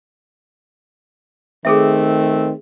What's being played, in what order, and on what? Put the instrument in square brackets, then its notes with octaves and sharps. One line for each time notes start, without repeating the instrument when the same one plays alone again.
[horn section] D#3 A3 C4 [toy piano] G#4 A4 E5